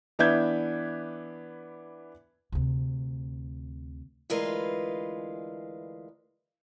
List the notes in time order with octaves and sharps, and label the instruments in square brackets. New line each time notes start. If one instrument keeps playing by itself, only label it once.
[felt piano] E3 B3 D4 E5 G6 G#6
[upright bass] D2 C3
[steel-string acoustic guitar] D2 E3 G#3 F4 A#4 B4